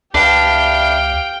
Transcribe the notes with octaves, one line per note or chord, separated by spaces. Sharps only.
C#2 D4 G4 B4 E5 F5 G5